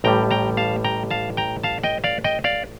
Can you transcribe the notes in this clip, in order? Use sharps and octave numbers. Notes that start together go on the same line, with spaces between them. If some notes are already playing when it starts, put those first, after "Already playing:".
A1 A2 G3 G5 A#5
G5 A#5
F5 A5
G5 A#5
F5 A5
G5 A#5
F5 A5
D#5 G5
D5 F5
D#5 G5
D5 F5